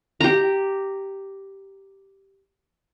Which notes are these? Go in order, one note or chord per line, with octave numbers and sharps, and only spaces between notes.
G4 A#5